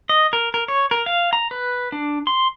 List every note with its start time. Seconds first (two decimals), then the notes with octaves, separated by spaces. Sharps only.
0.09 D#5
0.33 A#4
0.54 A#4
0.68 C#5
0.91 A#4
1.06 F5
1.33 A#5
1.51 B4
1.92 D4
2.27 C6